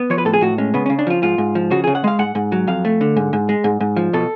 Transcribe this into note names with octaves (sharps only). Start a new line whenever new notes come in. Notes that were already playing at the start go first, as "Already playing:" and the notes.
Already playing: B3
F3 C#5
B4
A2 A4
G#4
A2 F#4
G#3 C#4
C#3 B3
C#4
C#3
D4
F3 F4
G#2 F4
G#2
F3
C#3 F#4
G#4
C#3
F#5
G#3 F5
G#2 F#5
G#2
F#3
F2 F5
A3
D3
G#2
G#2
G#3
G#2
G#2
F3
B2 A4